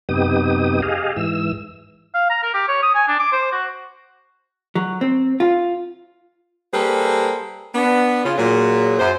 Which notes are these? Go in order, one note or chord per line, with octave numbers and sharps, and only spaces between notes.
F#2 C3 B3 D#4 G4 D#6
G4 G#4 D#5 F5
G#2 E3 E6
F5
A#5
A#4
G4
C#5
D#6
G#5
D4
D6
C5
F#4
F#3
C4
F4
G3 A#3 G#4 A4 B4 C5
B3 D4
C#3 F4
A#2 F#3 G#4
F#2 C5